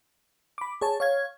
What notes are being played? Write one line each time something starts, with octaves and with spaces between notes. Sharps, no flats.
B5 D6
G#4 C#5 A5
C#5 F5 G#6